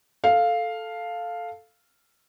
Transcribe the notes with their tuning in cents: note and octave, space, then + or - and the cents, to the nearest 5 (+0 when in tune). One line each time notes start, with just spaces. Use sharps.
A4 +0 F5 +0